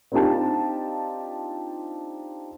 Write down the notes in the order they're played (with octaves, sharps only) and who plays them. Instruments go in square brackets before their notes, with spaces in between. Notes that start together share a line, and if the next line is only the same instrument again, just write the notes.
[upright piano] C4 D4 D#4 F4 G4 A5